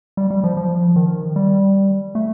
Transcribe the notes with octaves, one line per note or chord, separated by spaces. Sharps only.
G3
G3
F3
F3
D#3
G3
A3